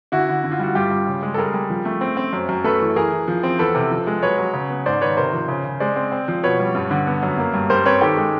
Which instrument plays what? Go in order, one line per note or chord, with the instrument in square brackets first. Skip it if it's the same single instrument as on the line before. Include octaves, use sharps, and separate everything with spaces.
[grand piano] D3 E4 F#4
D3
D3
F4
G3 F#4
G2 F4 G4
G3
C#3
G#3
A4
G3 G#4 A#4
G3
F3
A3
C4
C4
F#2
F#2
A3 A4 B4
E3
E3 G#4 A#4
E3
F3
C4
E2 A4 B4
C3
F3
G#3
F#3 B4 C#5
F#3
C#3
B3
G#2 C5 D5
D#3 B4 C#5
C3 A#4 C5
F3
C#3
C#3
G#3 C5 D5
C4
C4
F3
B2 B4 C#5
G3
G2
D3
B3
F#2
A#3
G2
G3 A#4 C5
C4 B4 C#5
D#3 G4 A4
G#3